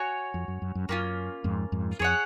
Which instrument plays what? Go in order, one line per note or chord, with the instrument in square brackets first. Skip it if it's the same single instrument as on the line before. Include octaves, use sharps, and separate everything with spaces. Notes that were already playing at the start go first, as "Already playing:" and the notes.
Already playing: [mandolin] F#4 C#5 G#5
[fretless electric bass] F2
F#2
F#2
F#2
[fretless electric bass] F#2 [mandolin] A#3 C#4 F4
[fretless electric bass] F2 G#2
F2 G#2
[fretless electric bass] F2 [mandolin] G#4 C#5 F#5